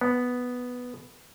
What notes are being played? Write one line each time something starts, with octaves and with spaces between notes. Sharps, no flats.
B3